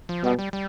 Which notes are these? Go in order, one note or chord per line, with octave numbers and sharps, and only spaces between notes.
F3
B2 G3
G3
G3